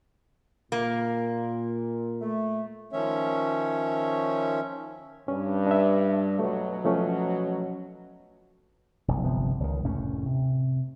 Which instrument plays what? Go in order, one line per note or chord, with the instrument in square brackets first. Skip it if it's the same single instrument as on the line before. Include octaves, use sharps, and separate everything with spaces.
[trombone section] A#2 [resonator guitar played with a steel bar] A#3
[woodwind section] A3
[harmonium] D#3 F3 C#4 C#5 E5
[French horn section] G2 [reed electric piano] C#4
[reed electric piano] D4 E5
[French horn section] B2 F#3 [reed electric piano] A3
[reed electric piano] F3 A3 C#4
[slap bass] F1 B1
G1 C3 F3 B3
C#2 D#3
F1 D#2 A2 C#4
C3